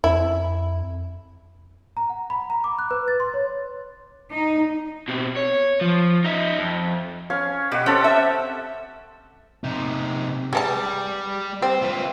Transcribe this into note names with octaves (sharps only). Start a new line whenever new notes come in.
F2 E4
A#5
F#5
B5
A#5
D6
F#6
B4
A6
C6
C#5
D#4
B2 C4
C#5
F3
D#4 E5
F2
C#4 C#5 F5
B2 G4 F#5
C4 C#4 A4 A5
E5
C3 D#4
G3 G#3 A#4 A5
C4 C5
F4 B4